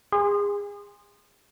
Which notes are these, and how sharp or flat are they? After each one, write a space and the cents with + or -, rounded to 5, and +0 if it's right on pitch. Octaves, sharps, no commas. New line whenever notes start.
G#4 -30 C6 +0